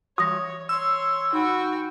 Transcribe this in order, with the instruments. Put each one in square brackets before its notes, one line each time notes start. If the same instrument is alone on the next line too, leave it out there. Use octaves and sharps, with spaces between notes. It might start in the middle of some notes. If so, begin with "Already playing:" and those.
[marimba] E3 A#6 [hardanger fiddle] C#5 [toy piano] D#6
[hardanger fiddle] C#5 C6 [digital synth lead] E6
[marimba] D#4 B5 [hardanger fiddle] F#4 G5